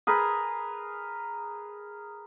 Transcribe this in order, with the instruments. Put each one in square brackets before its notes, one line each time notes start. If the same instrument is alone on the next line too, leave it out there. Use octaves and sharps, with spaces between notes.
[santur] G#4 A#4 B4